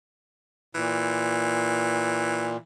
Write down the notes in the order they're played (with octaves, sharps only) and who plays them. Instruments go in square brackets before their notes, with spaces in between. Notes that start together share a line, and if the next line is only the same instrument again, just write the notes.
[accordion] A#2 [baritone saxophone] E3